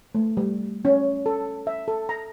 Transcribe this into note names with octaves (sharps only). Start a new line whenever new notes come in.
A3
G3
C#4
A4
E5
A4
A#5